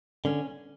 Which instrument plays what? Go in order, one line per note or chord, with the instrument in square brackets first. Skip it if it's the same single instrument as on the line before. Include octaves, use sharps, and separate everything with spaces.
[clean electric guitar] D3 [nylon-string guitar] C#4